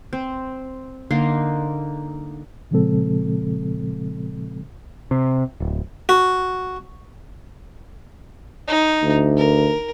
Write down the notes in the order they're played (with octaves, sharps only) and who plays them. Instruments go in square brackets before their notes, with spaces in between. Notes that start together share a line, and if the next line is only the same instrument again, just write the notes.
[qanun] C4
D3 A#3 D#4 C6
[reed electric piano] A#2 C#3 F3 G#3 C4 A4
[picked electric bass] C3
D1
[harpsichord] F#4
[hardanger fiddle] D#4
[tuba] D2
[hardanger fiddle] A#4